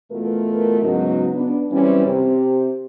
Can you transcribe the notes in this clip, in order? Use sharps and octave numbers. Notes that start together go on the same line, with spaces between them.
B2 E3 A3 F4 A#4
G#2 C#3 F#3 B3 D#4 F#4
B3 D4
F#2 E3 G3 C4 C#4
C3 C4 G4